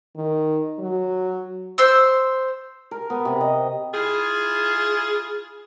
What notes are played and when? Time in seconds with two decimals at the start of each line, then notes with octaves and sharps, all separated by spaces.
0.16 D#3
0.79 F#3
1.78 C5 E6
2.91 A#4
3.10 B3
3.25 C3
3.41 D#5
3.94 E4 F4 G#4